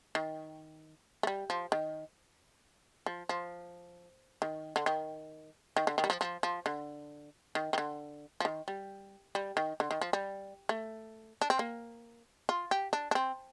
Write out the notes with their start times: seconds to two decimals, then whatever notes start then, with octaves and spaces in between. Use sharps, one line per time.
0.15 D#3
1.23 A3
1.27 G3
1.50 F3
1.72 D#3
3.06 F3
3.29 F3
4.42 D#3
4.76 D3
4.86 D#3
5.77 D#3
5.87 D3
5.98 D#3
6.04 G3
6.10 F3
6.21 F3
6.43 F3
6.66 D3
7.55 D#3
7.73 D#3
7.78 D3
8.40 F3
8.45 D#3
8.68 G3
9.35 G3
9.57 D#3
9.80 D3
9.91 D#3
10.01 F3
10.13 G3
10.69 A3
11.42 D4
11.50 C4
11.59 A#3
12.49 F4
12.71 G4
12.93 D4
13.11 D4
13.15 C4